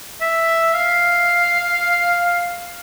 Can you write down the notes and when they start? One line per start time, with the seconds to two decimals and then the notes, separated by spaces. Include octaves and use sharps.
0.21 E5
0.74 F5